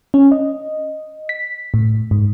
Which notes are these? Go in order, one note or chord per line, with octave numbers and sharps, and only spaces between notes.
C#4
D#5
B6
A2
G#2